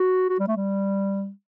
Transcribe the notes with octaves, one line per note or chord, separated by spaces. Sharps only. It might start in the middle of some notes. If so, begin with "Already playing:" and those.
Already playing: F#4
F#4
G3
A3
G3